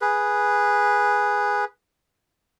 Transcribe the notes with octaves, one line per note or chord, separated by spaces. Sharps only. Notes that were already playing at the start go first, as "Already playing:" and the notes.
G#4 B4